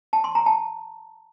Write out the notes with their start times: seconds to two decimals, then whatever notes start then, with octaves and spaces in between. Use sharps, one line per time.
0.13 A5
0.24 C6
0.35 A#5
0.46 A5